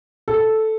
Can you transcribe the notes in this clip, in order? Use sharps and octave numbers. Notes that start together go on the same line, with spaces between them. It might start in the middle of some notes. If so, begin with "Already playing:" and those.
A4